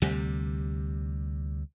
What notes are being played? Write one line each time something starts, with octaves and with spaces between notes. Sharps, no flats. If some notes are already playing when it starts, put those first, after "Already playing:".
D2 C3 G3